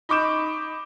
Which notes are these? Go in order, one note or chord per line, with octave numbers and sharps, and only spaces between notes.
D#4 B5 C#6 D6 G6 E7